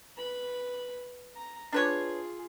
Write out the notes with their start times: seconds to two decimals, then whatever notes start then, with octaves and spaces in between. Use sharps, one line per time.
0.16 B4 B5
1.36 A#5
1.73 D4 F4 G#4 B4 C#5